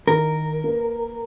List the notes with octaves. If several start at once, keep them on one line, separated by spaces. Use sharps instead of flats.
D#3 E4 A#4
A#3 B4